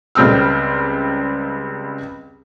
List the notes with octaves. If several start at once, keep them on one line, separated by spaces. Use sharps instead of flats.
C#2 G3 C4 E6 F6